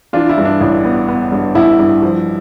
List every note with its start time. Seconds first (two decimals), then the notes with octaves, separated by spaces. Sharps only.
0.13 E3 D4 F4
0.29 E4
0.37 G2
0.45 D4
0.61 A1
0.84 B3
1.08 B3
1.32 G2
1.55 A1 E4
1.79 G2
2.02 F3